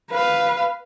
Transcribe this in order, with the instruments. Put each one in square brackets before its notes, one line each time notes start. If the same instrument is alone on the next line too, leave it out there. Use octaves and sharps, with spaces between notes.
[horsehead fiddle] B4 F5